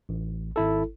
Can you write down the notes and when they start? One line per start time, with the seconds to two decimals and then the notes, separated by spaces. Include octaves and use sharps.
0.09 A1
0.56 G#1 E4 A4